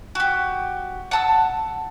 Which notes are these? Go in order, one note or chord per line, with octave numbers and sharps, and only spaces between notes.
F#4 G4
F#5 A5 E6